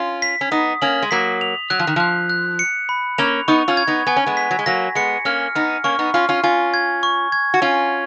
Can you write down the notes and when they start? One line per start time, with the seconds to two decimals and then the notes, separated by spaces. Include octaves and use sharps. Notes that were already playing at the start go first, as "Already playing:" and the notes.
Already playing: C#4 F4
0.22 B6
0.41 C#4
0.51 B3 D#4 D#6
0.82 A#3 C#4 F#7
1.02 G#3
1.11 F#3 A#3 B6
1.41 F7
1.70 F#3 F#6
1.79 F3
1.87 D#3
1.96 F3 F#6
2.30 F#6
2.59 C#7
2.89 B5
3.18 A#3 C#4 F7
3.48 B3 D#4 C#6
3.68 C#4 F4
3.77 G#6
3.87 B3 D#4
4.07 B3 G#5
4.16 C#4
4.26 G#3 B3
4.37 B6
4.51 F#3
4.59 G#3
4.66 F#3 A#3 A#6
4.95 G#3 B3 C#7
5.25 A#3 C#4 F6
5.55 B3 D#4 F6
5.84 A#3 C#4 C#6
5.99 B3 D#4
6.14 C#4 F4 F6
6.29 C#4 F4
6.43 C#4 F4 G#5
6.74 G#6
7.03 C#6
7.32 G#6
7.54 F#4
7.62 C#4 F4 G#5